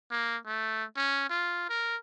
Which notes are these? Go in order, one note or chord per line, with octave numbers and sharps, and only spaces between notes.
A#3
A3
C#4
F4
A#4